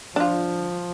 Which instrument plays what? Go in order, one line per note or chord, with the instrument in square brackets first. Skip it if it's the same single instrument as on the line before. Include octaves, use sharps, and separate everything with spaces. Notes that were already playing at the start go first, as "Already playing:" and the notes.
[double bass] F3 [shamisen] D4 F4